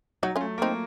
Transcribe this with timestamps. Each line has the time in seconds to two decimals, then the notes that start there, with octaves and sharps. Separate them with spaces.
0.23 F#3 D#4 F#4
0.36 C#4 F4
0.41 A3
0.58 A#3
0.62 C4 D#4